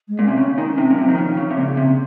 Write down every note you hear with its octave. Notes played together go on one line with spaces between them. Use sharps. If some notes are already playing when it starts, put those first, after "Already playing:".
G#3
A#2 C#4
C3
C#3 C4
C#4
D#3
C#4
C3
C#4
A#2 F#3
C3 F3
D#3
C#3
C#3
C3
A#2 C#3
C3